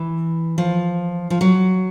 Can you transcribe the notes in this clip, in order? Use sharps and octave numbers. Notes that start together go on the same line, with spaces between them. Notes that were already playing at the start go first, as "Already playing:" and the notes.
Already playing: E3
F3
F3
F#3